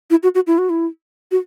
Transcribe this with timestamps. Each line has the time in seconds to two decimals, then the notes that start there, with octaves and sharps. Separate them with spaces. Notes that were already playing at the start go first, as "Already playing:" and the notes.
0.10 E4
0.23 F#4
0.35 F#4
0.47 E4
0.58 F#4
0.70 E4
1.31 F#4